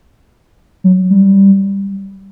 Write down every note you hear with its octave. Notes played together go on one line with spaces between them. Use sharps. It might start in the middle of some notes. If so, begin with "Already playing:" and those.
F#3
G3